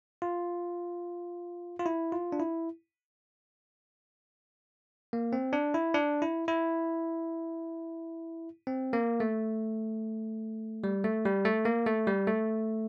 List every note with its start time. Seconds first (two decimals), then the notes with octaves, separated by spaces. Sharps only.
0.22 F4
1.79 F4
1.86 E4
2.12 F4
2.32 D4
2.40 E4
5.13 A#3
5.33 C4
5.53 D4
5.74 E4
5.94 D4
6.22 E4
6.48 E4
8.67 C4
8.93 A#3
9.20 A3
10.84 G3
11.04 A3
11.26 G3
11.45 A3
11.65 A#3
11.87 A3
12.07 G3
12.27 A3